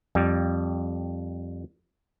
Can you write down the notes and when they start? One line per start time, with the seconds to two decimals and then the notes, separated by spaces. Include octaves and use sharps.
0.15 F2 G3